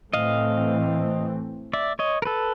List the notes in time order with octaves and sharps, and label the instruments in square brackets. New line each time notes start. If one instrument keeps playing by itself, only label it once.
[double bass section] A2 E3 A3 C4 [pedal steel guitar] D#5 F5
[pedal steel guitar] D5 E5
C#5 D#5
A#4
A4 B4